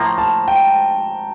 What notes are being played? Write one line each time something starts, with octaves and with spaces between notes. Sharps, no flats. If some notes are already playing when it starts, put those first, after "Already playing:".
Already playing: A2 F3 A#3 A#5
A5
G5